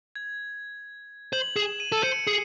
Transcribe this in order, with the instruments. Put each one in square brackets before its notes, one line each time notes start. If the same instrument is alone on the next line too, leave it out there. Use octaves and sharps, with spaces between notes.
[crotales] G#6
[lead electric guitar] C5 [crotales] F#7
[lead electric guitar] G#4 [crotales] E7
[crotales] D#7
[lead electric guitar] A4
[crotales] D#7
[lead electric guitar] C5 [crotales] C#7
[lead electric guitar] G#4 [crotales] C7